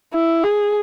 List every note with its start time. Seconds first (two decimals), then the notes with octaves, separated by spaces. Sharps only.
0.13 E4
0.43 G#4